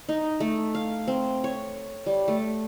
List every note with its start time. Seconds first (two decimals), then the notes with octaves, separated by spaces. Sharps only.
0.09 D#4
0.40 A3
0.75 F5
1.08 C4
1.44 C#5
2.06 G3
2.28 A3